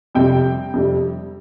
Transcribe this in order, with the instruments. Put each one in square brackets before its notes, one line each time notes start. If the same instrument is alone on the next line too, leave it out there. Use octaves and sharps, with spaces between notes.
[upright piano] F2 C3 G3 G5
F2 C3 G3